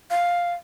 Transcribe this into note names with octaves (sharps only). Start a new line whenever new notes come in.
F5